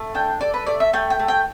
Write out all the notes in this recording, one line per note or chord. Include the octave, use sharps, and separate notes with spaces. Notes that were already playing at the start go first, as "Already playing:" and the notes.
Already playing: A3
D4 G5
A4 D5
B4
A3 D5
E5
A3 G5
G5
A3
G5